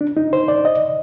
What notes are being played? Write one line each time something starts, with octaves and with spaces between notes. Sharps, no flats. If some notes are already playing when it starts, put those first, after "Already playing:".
D4
D#4
C5
D5
D#5